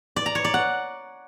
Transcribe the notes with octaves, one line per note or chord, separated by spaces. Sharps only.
D5
A#5
C#5
D5
F#5